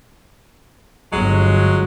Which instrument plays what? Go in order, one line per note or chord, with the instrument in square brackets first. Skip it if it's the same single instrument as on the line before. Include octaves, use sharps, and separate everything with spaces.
[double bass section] G1 [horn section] F#3 G#3